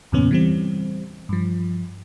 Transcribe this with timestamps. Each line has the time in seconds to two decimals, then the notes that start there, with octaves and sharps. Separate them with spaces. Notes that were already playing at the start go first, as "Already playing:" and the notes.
0.12 E2 G2 A#2 C#3 B3 C#4
0.31 E3 G3 C4
1.29 G2 F3